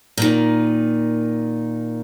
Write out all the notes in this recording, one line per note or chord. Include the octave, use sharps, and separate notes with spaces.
A#2 D#3